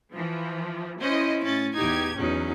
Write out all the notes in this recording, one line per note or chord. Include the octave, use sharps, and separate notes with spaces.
E3 F3
C#4 E4 C5 D#5
A2 C#4 A6
E2 D#4 G4 G#6
E2 F#3 C#4 D#4